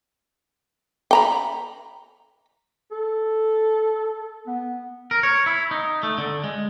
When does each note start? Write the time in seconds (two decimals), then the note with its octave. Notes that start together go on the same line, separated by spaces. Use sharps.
1.11 G5 A#5 B5
2.92 A4
4.47 B3
5.11 A#4
5.23 C#5
5.46 E4
5.71 D#4
6.03 A3
6.18 D3
6.44 G#3